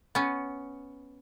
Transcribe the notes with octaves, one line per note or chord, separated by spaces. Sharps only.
B3 C#4